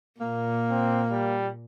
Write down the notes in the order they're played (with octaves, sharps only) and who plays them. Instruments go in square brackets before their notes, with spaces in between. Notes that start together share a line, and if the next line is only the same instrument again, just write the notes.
[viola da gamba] A#2 [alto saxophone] A#3
[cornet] C4
G3